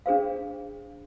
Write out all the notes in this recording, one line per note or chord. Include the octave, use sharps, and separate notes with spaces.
D4 G#4 C5 F5